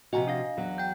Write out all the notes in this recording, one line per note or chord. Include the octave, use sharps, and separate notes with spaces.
C3 F3 F#4 D#5 G#5 A#5
D4 F5 A#6
E2 F#3
G5 G6